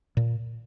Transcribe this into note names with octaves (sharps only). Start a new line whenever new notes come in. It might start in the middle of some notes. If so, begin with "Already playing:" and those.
A#2